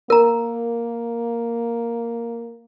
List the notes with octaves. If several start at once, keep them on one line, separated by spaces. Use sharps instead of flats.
A#3 A#4 A#5